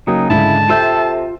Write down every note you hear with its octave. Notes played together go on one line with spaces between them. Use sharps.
C#3 F#3 A#3 D#4 G5 D#6
G#2 D3 E4 A5
C3 F4 A4 E5 G5 E6 G6